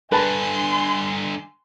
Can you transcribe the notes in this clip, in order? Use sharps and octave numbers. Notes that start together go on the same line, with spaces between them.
G2 D3 B4 G#5 A5 B5 C6